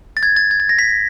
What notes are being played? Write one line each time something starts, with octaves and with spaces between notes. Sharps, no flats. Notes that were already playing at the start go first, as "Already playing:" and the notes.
A6
G#6
A6
G#6
A6
A#6
B6